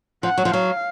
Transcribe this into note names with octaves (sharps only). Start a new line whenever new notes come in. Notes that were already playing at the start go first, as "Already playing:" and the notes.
F3 F#5
F#3
F3
F#3 F5